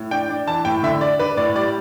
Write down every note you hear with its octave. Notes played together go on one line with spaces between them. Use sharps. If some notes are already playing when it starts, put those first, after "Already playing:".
Already playing: A2
D4 G5
D4
E3 A5
A2 G5
D3 E5
D4 D5
D4 B4
A2 D5
G3 D5